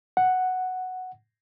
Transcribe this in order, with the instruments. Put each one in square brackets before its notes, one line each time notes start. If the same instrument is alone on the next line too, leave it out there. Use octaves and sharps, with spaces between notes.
[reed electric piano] F#5